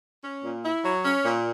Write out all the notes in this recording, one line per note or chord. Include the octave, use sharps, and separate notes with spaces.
C#4
A#2
E4
F#3
C#4
A#2